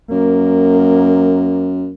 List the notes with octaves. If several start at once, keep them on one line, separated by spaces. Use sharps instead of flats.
F#2 A#3